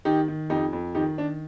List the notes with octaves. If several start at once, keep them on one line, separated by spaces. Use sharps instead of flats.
D#3 D#4 G4
D#3
F2 D#4 G4
F2
D#3 D#4 G4
D#3 D4